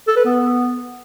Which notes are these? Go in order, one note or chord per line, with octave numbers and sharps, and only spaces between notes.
A4
B4
B3